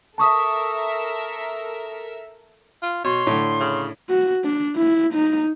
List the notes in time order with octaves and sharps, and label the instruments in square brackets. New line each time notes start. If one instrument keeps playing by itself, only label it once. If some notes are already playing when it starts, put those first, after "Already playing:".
[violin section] A4 A#4 E5 [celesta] A5 C#6 D#6
[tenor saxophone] F4
[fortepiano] B2 [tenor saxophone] C#5 [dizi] C6
[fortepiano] A2 D3
[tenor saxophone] C#3
[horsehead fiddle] F#4
D4
E4
D#4